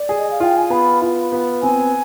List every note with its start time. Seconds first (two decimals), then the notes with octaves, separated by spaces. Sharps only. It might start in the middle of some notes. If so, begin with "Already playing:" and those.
Already playing: D5
0.09 G#4
0.18 D#5
0.31 F5
0.40 F4 G5
0.57 G#5
0.70 B3 B5
1.01 F4
1.32 B3
1.63 C4 G#5